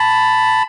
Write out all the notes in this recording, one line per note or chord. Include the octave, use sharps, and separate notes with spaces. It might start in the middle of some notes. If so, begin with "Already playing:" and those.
Already playing: A5 B5